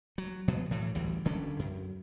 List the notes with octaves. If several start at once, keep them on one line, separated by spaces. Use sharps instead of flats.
F#3
B2 F3 F#3
A2 E3 F#3
A1 D2 E3 G3
F#1 D3 C#4 D4
F#2